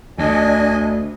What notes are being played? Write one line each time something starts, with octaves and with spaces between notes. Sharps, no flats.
D2 D4 D#5 G#5